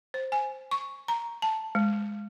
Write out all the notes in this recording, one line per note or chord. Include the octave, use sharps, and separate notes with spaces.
C5
G#5
C#6
A#5
A5
G#3